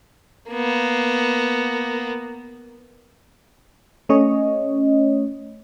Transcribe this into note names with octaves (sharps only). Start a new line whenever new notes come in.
A#3 B3
A3 C#4 C#5 D#5